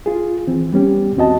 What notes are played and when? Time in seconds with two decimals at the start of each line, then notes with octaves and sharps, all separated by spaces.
0.06 F4 G#4
0.47 E3 C4
0.73 G3 B3 C#4 G4
1.17 D#2 C4 F#4 D#5 A5